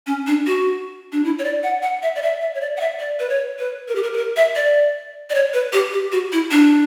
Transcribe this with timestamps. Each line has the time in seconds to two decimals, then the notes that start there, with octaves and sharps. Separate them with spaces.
0.07 C#4
0.27 D4
0.47 F#4
1.12 D4
1.24 E4
1.38 C#5
1.44 D5
1.63 F#5
1.82 F#5
2.03 E5
2.16 D5
2.22 E5
2.41 E5
2.55 C#5
2.61 D5
2.77 F#5
2.81 E5
3.00 D5
3.19 B4
3.29 C#5
3.59 B4
3.88 A#4
3.95 G4
4.03 A#4
4.14 B4
4.16 A#4
4.37 E5
4.55 D5
5.30 D5
5.35 C#5
5.54 B4
5.73 G4
5.93 G4
6.12 F#4
6.32 E4
6.51 D4